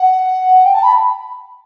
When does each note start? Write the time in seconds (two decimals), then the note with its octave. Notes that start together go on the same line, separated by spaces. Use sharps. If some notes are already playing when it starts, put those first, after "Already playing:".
Already playing: F#5
0.64 G5
0.73 A5
0.83 B5